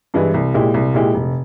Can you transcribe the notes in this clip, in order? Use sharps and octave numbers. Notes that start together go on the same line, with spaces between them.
G2 E3 G#3 E4
C2
A#2 G#3 E4 G4
C2
A#2 G#3 E4 G4
F1